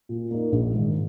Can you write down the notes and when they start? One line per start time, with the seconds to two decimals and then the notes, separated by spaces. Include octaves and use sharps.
0.09 A#2
0.31 A#3 D#4
0.52 A#1
0.73 G#2 D#3